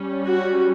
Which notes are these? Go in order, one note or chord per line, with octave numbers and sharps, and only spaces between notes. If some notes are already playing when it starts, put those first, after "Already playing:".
Already playing: G3 C#4
F#4